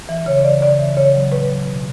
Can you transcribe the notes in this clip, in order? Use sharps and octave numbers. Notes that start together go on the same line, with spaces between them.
E3
C#3 C#5
E3 D5
C#3 D5
E3
C#3 C#5
F#3
A2 B4
F#3
B2